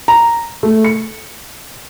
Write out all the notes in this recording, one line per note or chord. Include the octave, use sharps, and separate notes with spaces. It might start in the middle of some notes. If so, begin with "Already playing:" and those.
A#5
A3
C#7